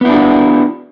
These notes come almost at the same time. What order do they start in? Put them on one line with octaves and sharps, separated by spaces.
B3 E4 D4 F#4